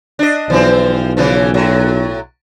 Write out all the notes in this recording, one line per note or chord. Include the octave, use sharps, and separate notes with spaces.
D4 D#5
B1 E3 F3 C4
C#3 E3 F3
A2 F#3